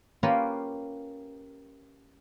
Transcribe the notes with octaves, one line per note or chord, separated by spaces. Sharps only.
A#3 C#4 F4 G4 A#4 B4